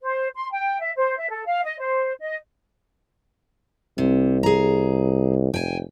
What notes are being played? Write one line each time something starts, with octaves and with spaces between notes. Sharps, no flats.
C5
C6
G5
E5
C5
E5
A4
F5
D#5
C5
D#5
C2 C3
G#4 A#5
F1 G5 G#5